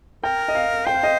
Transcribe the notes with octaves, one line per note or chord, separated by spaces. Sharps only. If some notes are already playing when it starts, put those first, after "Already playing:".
A#4 G5
D#5
F5
C5 G5
F5
D#5